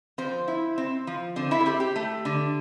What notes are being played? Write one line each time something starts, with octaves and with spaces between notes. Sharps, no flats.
F3 C4 C5
E4
C4
F3
D3 C4 C5
E4 E5
A4
C4 G4
G4
A3
D3